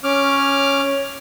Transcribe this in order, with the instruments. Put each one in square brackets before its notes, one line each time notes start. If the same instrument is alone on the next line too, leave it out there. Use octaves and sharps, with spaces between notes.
[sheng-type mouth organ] C#4 D6 F6